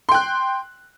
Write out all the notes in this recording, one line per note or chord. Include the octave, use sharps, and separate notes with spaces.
G5 C6 F#6